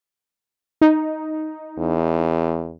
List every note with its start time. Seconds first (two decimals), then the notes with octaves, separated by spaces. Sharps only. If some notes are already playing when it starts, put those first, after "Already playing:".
0.81 D#4
1.78 E2